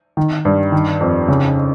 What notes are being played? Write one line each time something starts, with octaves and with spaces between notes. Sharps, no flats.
D#3
G2
D#3
F2
C#3